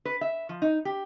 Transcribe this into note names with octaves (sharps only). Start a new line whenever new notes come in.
B4
E5
F3
D#4
G4